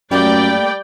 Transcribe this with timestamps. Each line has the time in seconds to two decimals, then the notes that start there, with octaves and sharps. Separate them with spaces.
0.11 F#2 G3 A3 A#3 G4 D5 G5